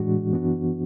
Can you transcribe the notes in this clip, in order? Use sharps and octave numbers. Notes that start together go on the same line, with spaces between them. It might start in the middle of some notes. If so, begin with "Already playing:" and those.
Already playing: A2 E3 G#3 D4 F#4
F#2 E3 B3 D4 F#4